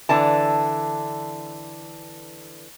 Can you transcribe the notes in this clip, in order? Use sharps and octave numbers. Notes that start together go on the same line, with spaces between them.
D3 E3 A5